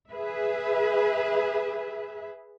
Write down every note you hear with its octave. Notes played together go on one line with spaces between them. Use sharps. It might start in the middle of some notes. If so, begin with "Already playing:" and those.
G#4 B4 E5